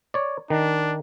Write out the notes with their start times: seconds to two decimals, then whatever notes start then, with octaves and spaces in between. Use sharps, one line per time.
0.14 C#5 D5
0.50 D#3 D4